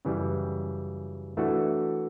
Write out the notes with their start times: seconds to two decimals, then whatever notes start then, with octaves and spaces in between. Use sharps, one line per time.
0.05 F#2 C#3 E3 G3
1.37 E3 A3 D4 F#4